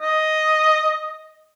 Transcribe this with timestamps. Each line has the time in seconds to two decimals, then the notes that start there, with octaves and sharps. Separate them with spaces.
0.01 D#5